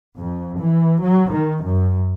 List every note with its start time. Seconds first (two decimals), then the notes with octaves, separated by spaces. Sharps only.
0.19 F2
0.60 E3
1.03 F#3
1.33 D#3
1.64 F#2